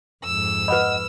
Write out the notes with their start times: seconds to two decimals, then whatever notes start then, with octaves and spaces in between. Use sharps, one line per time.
0.25 F2 G#2 E6
0.68 B4 D#5 F#5 B5